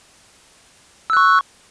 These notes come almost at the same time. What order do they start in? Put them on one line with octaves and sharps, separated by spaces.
E6 F#6 C#6